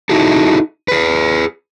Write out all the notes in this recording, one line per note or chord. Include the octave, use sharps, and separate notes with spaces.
D#4 E4 F#4 G#4 A4
G#4 B4